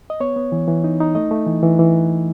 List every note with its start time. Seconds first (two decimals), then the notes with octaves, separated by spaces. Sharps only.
0.10 D#5
0.20 B3 C#5
0.36 B3
0.52 E3
0.68 E3
0.84 D#4
1.00 D#4
1.15 A3 D#5
1.31 A3
1.47 E3
1.63 E3
1.79 E3